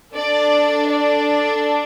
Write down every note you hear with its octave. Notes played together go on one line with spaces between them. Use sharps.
D4 A4 D5
D5